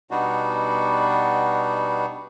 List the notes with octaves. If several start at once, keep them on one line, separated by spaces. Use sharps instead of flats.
B2 G3 B3 D4 D#4 F#4